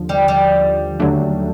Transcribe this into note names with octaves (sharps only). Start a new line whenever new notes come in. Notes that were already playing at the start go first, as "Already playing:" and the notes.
Already playing: D#2 D3 F3
G3
G3
D#2 D3 F#3 A3 D4